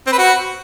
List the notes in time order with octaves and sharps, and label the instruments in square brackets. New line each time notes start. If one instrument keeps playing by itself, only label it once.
[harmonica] C4
B4
F#4